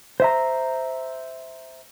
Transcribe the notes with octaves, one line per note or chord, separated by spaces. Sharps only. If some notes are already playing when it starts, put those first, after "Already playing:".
C5 E5 A#5